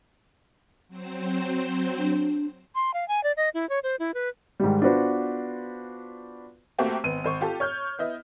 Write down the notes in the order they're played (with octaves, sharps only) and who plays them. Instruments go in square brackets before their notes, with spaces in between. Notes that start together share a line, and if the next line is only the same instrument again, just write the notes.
[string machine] F#3 C4 C5
[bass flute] D4
[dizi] C6
F5
G#5
D5
D#5
E4
C#5
C5
E4
B4
[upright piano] G#2 D#3 G3
B3 D4 F4 F#4 B4 C5
[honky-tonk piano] A3 A#3 C4 F#4 G4
G#1 B3 D#7
G#1 C5 C#6
F4 G4 A4
C#5 F6 G6
B3 E4 D#5